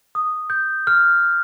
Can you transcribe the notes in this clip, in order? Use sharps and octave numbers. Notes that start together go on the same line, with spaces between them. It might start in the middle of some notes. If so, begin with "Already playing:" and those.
D#6
G6
F6